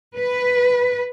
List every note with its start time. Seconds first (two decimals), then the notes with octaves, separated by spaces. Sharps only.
0.17 B4